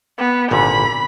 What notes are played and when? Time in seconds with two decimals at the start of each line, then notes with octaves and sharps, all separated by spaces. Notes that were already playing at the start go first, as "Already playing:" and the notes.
0.18 B3
0.51 G#1 A#2 D3 B5